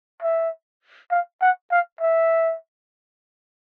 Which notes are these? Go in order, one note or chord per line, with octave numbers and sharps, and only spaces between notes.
E5
F5
F#5
F5
E5